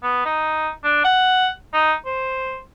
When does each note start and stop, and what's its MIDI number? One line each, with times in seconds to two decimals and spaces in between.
0.03 0.24 59
0.25 0.70 63
0.84 1.00 62
1.05 1.48 78
1.73 1.93 63
2.05 2.60 72